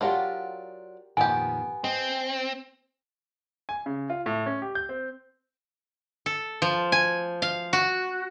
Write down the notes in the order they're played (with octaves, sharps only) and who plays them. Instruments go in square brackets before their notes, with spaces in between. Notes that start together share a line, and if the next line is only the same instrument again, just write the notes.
[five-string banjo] F#3 D4 F4 [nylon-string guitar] G4 A#4 F#5
[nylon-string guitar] F2 A#2 D#3 [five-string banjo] B3 G4 [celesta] G#5
[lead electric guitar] C4 [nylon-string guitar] D#5
[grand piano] G#5
C#3
F4
A2
C#4
G4
G6
C4
[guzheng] A4
F3
G#5
F5
F#4